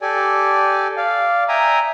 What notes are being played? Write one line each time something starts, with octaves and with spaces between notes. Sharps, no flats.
G4 A4 D5 G#5
D5 F5
E5 G5 G#5 A#5 D#6